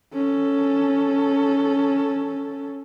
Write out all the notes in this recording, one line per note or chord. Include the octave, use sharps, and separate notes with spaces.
C#4 A4